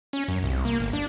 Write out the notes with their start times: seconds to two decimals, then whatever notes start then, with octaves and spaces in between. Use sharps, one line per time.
0.13 C#4
0.28 F#2
0.43 C2
0.65 A#3
0.80 G1
0.93 D4